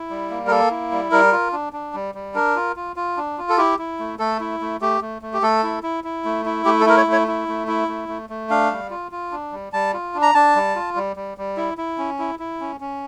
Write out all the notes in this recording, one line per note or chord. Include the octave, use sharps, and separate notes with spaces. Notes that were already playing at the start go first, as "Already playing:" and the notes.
Already playing: E4
G3
A#3
A#4
A#3 A4
E4
G3
G3 A#4
F4
D4
D4
G3
G3
D4 A#4
F4
F4
F4
D4
F4
A4
E4 G4
E4
A3
A3 A4
E4
A3
A3 G4
A3
A3
G4
A3 A4
E4
E4
E4
A3
E4
A3 G4
A4
E4 A#4
C#5
A3
C#5
E4
A3
E4
A3
A3
A3
D4 F5
G3
F4
F4
D4
G3
G3 A5
F4
D4
A#5
D4 A5
G3
F4
G3
G3
G3
E4
E4
C#4
E4
E4
C#4
C#4